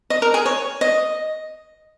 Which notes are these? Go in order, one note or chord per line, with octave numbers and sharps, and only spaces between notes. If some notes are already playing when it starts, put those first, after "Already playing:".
D#5
A#4
G#4
C#5
D#5